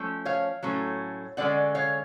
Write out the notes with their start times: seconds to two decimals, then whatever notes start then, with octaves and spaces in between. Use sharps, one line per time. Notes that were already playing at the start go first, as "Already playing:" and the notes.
Already playing: F3 A3 C#4
0.25 C#5 F5
0.63 A2 F#3 A3 C#4
1.37 D3 G#3 C#4 D5 F#5
1.75 C#5 F5